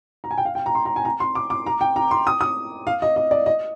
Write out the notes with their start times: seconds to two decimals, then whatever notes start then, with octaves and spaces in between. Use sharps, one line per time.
0.24 A#5
0.31 G#5
0.38 G5
0.45 F5
0.55 G5
0.66 A#5
0.75 C6
0.86 A#5
0.96 G#5
1.05 A#5
1.20 C6
1.35 D6
1.50 D6
1.66 A#5
1.81 G5
1.96 A#5
2.11 C6
2.27 D#6
2.41 D#6
2.87 F5
3.02 D#5
3.16 D#5
3.31 D5
3.46 D#5